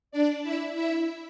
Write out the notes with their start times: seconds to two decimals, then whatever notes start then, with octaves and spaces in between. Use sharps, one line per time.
0.11 D4 D5
0.43 E4 E5
0.75 E4 E5